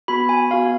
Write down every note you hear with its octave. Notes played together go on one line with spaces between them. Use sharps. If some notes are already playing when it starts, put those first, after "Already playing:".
B3 F#4 B5
G#5
B3 F#4 F5